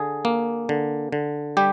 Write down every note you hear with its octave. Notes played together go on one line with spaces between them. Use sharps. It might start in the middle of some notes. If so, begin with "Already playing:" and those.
Already playing: D3 G#4
A#3
D3
D3
G3 G4